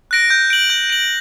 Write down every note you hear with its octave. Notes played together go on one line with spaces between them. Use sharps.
F#6 A#6 D7
G6
D7 F#7
G6
D7 F#7